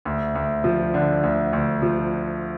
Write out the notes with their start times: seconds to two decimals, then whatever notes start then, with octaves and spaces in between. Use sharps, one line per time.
0.05 D2
0.35 D2
0.64 F3
0.94 D3
1.23 D2
1.53 D2
1.82 F3